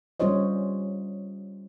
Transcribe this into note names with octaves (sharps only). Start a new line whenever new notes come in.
G3 C#4 F4 C5 C#5 D#5